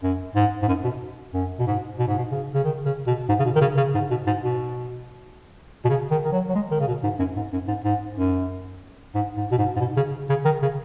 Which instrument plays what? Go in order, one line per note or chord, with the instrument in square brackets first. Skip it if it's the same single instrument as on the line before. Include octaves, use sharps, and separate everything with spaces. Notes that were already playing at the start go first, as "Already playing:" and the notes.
[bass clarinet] F#2
G#2
G#2
F#2
B2
F#2
B2
G#2
B2
G#2
B2
C#3
C#3
D#3
C#3
B2
G#2
C#3
B2
D#3
C#3
C#3
G#2
B2
G#2
B2
B2
C#3
D#3
D#3
F#3
F#3
G#3
D#3
C#3
B2
G#2
F#2
G#2
F#2
G#2
G#2
F#2
G#2
G#2
B2
G#2
G#2
B2
C#3
C#3
D#3
C#3